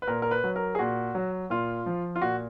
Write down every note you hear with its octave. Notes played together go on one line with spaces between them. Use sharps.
B4
A#2 A#4
A#4
B4
F#3
A#4
G#4
A#2 F#4
F#3
A#2 F4
F3
F4
A#2 F#4